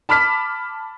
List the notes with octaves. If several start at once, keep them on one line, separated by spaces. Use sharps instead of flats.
A5 B5 D6 F6 B6